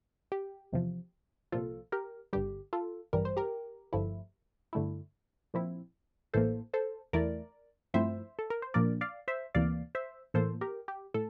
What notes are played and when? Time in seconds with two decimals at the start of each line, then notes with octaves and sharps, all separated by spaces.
0.32 G4
0.72 E2 C3 F3
1.52 C2 A#2 F3 F4 A4
1.92 G4 A#4
2.33 G1 G2 D3 G3 G4
2.73 F4 A4
3.13 A1 G2 E3 G3 A#4
3.25 C5
3.37 G4 A#4
3.93 G1 G2 F3 A3 E4
4.73 G2 D3 A3 E4
5.54 A#2 F3 C4 E4
6.33 A1 A2 E3 A#3 A4 C5
6.74 A4 C5
7.13 E2 E3 A3 E4 A#4 D5
7.94 G2 F3 A3 C4 E4 C5 E5
8.39 A4
8.50 A#4
8.62 C5
8.74 A#2 F3 A#3 D4 A#4 D5
9.01 D5 F5
9.28 C5 E5
9.55 D2 C3 E3 A#3 D5 F5
9.95 C5 E5
10.34 A2 E3 A#3 A4 C5
10.61 G4 A#4
10.88 G4
11.14 A2 A4